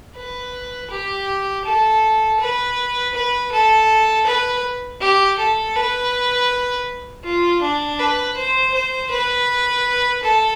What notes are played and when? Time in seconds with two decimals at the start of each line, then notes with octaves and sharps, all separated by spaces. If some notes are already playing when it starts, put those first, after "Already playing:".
0.16 B4
0.91 G4
1.65 A4
2.40 B4
3.14 B4
3.51 A4
4.26 B4
5.01 G4
5.39 A4
5.75 B4
7.24 F4
7.62 D4
7.99 B4
8.37 C5
8.74 C5
9.11 B4
10.23 A4